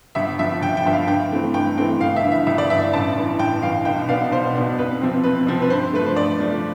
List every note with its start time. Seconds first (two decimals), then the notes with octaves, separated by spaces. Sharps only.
0.15 G1 E5
0.39 G2 F3 E5
0.61 G1 G5
0.77 G5
0.85 G2 F3 E5
0.93 F5
1.08 G2 G5
1.32 E3 A3 C4
1.54 G2 G5
1.78 E3 A3 C4 G5
2.01 G1 F5
2.16 E5
2.23 G2 E3
2.32 E5
2.47 G1 E5
2.58 D5
2.69 E3 E5
2.73 G2
2.82 E5
2.93 A1 A5
3.16 G2 E3
3.39 A1 G5
3.62 G2 E3 F5
3.85 B1 G5
4.08 B2 B3 D4 F5
4.31 B1 C5
4.55 B2 B3 D4
4.78 F2 B4
5.01 C3 F3 C4
5.24 F2 B4
5.47 C3 F3 C4
5.62 B4
5.70 G2 C5
5.93 F3 A3 B4
6.06 C5
6.16 G2 D5
6.40 F3 A3